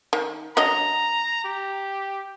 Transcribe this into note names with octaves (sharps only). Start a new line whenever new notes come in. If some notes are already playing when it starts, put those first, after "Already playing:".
D#3
F#3 D4 D#5 A#5
G4